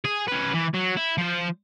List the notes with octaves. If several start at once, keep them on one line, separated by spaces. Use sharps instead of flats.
G#4
C#4 B4
E3
F#3
E4
F3 C5